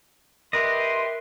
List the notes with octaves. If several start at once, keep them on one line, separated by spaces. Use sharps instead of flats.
G4 A#4 B4 D#5 E5 C6